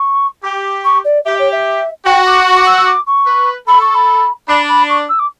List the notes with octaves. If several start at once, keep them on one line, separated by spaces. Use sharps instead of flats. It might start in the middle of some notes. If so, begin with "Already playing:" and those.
Already playing: C#6
G4
C#6
D5
G4 E5
C#5
E5
F#4 G5
D6
C#6
D6
E6
E6
D6
C#6
B4
A4 B5
C#6
B5
D4 B5
B5
C#6
E6
D6